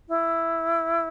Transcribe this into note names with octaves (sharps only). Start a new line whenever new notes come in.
E4